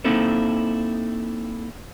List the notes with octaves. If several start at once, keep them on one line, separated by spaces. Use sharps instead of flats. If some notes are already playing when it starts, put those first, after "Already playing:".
A#3 C4 D#4 E4 A4 C5